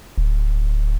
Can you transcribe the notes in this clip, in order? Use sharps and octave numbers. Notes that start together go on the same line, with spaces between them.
D1